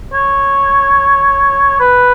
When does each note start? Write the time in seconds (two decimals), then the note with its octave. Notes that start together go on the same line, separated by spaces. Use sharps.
0.14 C#5
1.80 B4